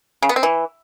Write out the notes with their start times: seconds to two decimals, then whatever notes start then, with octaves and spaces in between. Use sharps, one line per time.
0.22 C#3
0.29 B3
0.36 C4
0.43 E3